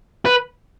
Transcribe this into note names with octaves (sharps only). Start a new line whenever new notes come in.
B4